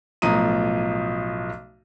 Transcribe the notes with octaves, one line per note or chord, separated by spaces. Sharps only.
B1 A2 F3 A#5 D#6 D#7